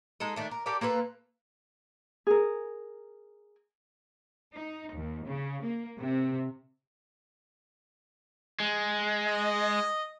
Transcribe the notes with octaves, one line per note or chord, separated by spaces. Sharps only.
G#3 D#4 A4
D#3 A3 D4
A#4
G4 A4 A#4 D5
A#3 F4 A4 B4
G#4 A#4
D#4
D#2
C#3
A#3
C3
G#3
D#5